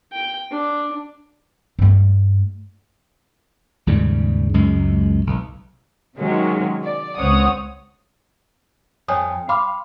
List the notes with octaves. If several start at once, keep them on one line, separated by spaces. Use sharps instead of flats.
G5
D4
G2 A3
D#2 G#2 C#3 G3
C#2 F#2 G#3
B1
C3 D#3 F#3 G#3 A#3 C#4
D5
C#2 C4 C#5 F#5 D#6
F2 C#5 G#5 D#6
F5 B5 C6 D6